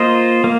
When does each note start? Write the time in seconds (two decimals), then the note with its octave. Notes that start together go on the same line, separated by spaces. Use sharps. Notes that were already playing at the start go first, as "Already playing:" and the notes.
Already playing: A#3 F4 C5 D#5
0.44 A#3